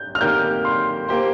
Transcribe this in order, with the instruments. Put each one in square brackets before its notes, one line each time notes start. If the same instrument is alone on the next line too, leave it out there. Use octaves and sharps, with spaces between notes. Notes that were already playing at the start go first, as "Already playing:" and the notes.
Already playing: [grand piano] G6
F6
[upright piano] D#3 A#3 G4 A#4 [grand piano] G6
[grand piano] C6
[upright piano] A#3 G4 C5